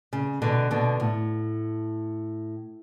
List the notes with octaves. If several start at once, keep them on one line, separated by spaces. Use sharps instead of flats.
C#3
B2 D3
B2 D3
A2